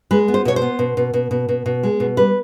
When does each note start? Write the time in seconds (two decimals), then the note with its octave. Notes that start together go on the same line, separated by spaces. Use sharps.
0.11 G#3 B4
0.28 B3
0.34 C5
0.45 B2 C#5
0.56 C5
0.62 B3
0.79 B2
0.97 B2
1.14 B2
1.31 B2
1.49 B2
1.66 B2
1.83 G#3
2.00 B2
2.17 G3 B4